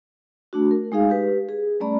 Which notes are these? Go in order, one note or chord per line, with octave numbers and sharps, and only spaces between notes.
A3 D4 F#4
A#4
G#3 D#4 G#4 F5
G4 B4
G#4
G3 A3 C#4 D5 A#5 B5